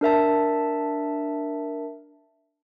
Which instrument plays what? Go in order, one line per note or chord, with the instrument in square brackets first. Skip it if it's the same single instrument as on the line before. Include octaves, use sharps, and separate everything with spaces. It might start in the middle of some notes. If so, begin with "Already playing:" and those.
[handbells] D4 A#4 E5 A5